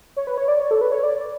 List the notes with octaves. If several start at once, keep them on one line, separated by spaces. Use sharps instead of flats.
C#5
B4
C#5
D5
C#5
A4
B4
C#5
D5